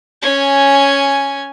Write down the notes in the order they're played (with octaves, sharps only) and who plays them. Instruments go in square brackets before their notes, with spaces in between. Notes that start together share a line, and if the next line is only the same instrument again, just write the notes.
[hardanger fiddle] C#4 G#5